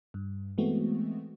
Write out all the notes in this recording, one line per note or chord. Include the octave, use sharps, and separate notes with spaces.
G2
E3 G#3 A3 B3 C4 F#4